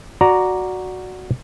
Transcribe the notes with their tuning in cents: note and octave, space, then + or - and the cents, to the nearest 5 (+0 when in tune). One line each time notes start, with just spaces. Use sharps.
F#4 -5 D5 +0 A#5 +0